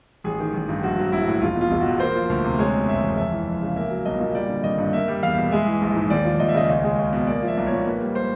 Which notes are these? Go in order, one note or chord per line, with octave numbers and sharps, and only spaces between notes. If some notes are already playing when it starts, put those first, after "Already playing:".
A1 G#4
D#3
A1
G2
A#1 F#4
F#3
A#1 E4
A2
E1 F4
B2
F4
E1
E2 F#4
A#3 C5
F3
D2
C3
G#3 C#5
B2
F#1 E5
E2
F2 E5
E3
F2
C#3
A#3 E5
F#3
B1 D#5
A#2
G3 D5
D3
G#1 D#5
G2
A#3 E5
G3
E2 F5
B2
G#3 E5
E3
A#1
G#2
D#2 D5
F3
D#2 D#5
E5
C#3 D#5
C#2 D#5
G#3
C#2
B2
A#3 D5
F3 E5
B1
C#5
A#2
A#3 B4
G3
C5